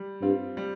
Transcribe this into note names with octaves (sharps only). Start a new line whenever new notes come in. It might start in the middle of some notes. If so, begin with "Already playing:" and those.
Already playing: G3
G2 C4 F4
G3